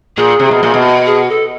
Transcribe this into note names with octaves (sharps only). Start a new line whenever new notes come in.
A#2 G#4
C3
B2
A#2
B2
G#4
A4